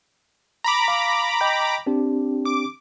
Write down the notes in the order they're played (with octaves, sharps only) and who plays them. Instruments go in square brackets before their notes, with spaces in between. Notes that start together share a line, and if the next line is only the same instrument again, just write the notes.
[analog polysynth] A#5 B5 D6
[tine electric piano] F5
D#5 G5 G6
C4 D4 G4
[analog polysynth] D6